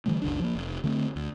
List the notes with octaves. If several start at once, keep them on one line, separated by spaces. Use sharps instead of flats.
D3 E3 G3 A3
F#1 C#2 D4
F3 A#3
F1
D3 A3 B3 C4
D2